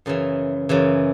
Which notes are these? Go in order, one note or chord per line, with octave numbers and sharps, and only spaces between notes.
F#2 C#3 E3
F#2 C#3 E3